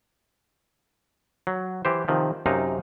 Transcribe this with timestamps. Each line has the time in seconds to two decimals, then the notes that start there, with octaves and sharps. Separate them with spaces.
1.47 F#3
1.85 E3 G4 C5
2.08 C3 D#3 F3
2.46 F#2 C3 D#4 F5